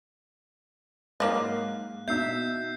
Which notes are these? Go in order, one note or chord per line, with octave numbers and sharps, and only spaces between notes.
G#2 F#3 A#3 D#5 F5 F#6
B2 D#4 E5 E6 G6 C7